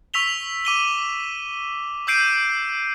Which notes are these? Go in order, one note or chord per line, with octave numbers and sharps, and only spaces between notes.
C#6 E6 B6 F7 G7
D6 D#7 G7
D6 E6 G6 C7 D7 D#7